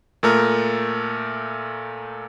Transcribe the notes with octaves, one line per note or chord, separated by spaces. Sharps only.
A#2 A3 A#4